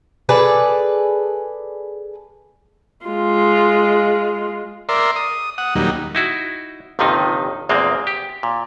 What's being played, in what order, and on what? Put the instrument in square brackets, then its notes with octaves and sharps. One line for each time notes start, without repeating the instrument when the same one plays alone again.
[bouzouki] G#4 A4 B4 D5
[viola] G#3 F4
[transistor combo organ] A#4 D5 E5 C6
D#6
F#5 D#6
D#2 A#2 F#3 G3 D#4
[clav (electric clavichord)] D#4 E4 F#4
G1 D#2 C3 D#3 F3 D#4
A#1 E2 G#3 A#3 C4
G4
A#2